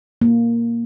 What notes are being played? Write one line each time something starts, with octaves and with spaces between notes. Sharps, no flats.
A#3